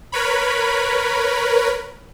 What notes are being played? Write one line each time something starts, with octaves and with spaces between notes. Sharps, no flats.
A#4 B4 C#5 B5